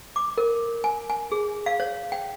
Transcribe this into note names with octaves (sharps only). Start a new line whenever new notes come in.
D6
A#4
G#5
G#5
G#4
F5
C#5
G5